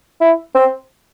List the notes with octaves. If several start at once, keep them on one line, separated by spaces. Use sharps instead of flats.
E4
C4